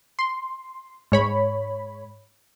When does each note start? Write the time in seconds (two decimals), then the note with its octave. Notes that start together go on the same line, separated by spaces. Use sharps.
0.19 C6
1.12 G#2 C#5 B5